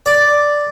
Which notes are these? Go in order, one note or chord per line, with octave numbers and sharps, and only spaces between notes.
D5